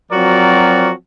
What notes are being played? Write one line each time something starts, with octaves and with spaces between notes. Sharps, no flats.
F3 F#3 C4 F#4 A#4 D5